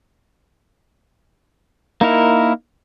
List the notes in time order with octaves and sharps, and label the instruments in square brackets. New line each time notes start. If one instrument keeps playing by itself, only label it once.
[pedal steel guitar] A#3 D#4 E4 A#4